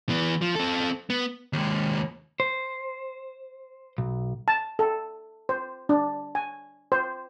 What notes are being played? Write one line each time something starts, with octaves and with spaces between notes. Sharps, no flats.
E3 B3
F3
C4 A4
B3
D#2 G#3
C5
B1
A5
A4
C5
D4
G#5
C5